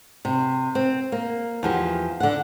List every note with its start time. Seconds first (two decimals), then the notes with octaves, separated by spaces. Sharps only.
0.25 C3
0.75 C4
1.12 A#3
1.63 E2 F3 G4
2.20 D3 F#5